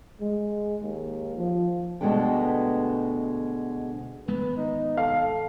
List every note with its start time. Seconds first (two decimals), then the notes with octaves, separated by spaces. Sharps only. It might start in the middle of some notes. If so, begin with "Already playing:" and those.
0.21 G#3
0.83 D#2
1.37 F3
2.01 D2 B2 G#3 A3 D4 G5
4.28 G#1 G#3 B3 B4
4.57 D#4
4.97 A4 F5